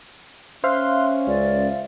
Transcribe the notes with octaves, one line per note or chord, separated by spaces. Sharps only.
C#4 C5 E5 F5 C6 F6 F#6
C#2 D5